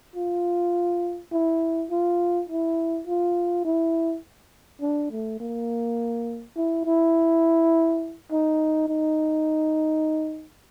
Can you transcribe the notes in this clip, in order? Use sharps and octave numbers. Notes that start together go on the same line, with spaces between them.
F4
E4
F4
E4
F4
E4
D4
A3
A#3
E4
E4
D#4
D#4